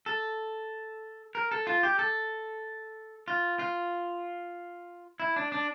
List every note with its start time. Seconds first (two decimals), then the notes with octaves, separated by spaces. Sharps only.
0.06 A4
1.35 A#4
1.51 A4
1.67 F4
1.83 G4
1.99 A4
3.28 F4
3.59 F4
5.20 E4
5.36 D4
5.52 D4